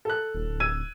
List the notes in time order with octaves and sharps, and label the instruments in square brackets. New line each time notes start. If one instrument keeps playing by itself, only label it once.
[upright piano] A4 F#6
[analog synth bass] D#1
D1
[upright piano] E6 G#6 D#7